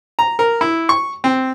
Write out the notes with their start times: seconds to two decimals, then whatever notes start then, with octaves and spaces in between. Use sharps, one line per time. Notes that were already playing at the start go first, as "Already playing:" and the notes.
0.19 A#5
0.39 A#4
0.61 E4
0.89 C#6
1.24 C4